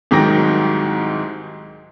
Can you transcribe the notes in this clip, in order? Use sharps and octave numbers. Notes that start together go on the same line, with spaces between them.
C2 G#2 D#3 F#3 G5 A#6